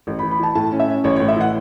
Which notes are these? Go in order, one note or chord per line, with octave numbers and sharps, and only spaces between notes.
A1
B5
E3
B5
E3 A5
A2 A5
C#4
E5
C#4
A1 C#5
C#5
A2
E5
E3 F#5